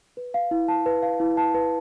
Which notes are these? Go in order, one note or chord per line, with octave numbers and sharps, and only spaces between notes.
B4
F5
E4
A5
B4
F5
E4
A5
B4